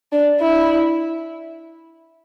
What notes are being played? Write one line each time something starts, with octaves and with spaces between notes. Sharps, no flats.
D4
E4